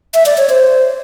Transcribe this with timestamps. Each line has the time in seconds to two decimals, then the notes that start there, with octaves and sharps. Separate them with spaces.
0.14 E5
0.26 D5
0.38 C#5
0.49 C5